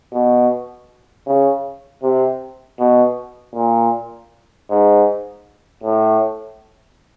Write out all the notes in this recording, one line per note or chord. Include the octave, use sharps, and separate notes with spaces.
B2
C#3
C3
B2
A#2
G#2
A2